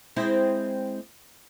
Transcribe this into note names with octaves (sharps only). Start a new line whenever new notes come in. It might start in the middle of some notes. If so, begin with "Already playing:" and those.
G#3 C4 E4